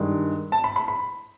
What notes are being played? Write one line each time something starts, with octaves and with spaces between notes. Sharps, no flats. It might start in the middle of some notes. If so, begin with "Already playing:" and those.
Already playing: G2 D#3 G#3
A5
B5
B5
B5